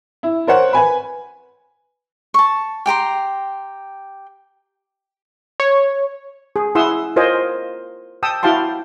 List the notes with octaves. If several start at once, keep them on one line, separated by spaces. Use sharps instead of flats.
E4
A#4 C5 C#5 F#5
B4 G#5 B5
A5 C#6
G4 G5 A#5 C6
C#5
G#4
E4 G#4 F#5 C6 D#6 E6
F4 A#4 C5 C#5 D#5 G#5
G5 A5 D#6 E6
E4 F#4 F5 G5 A5 C6